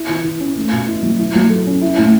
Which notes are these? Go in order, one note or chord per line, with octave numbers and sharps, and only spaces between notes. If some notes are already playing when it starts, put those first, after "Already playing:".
Already playing: E4
E3
E3
C#4
A3
B2
E4
F#3
E4
F#3
A4
C#4
E4
A2